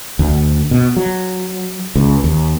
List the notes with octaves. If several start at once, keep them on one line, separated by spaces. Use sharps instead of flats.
D2
B2
F#3
C#2
D#2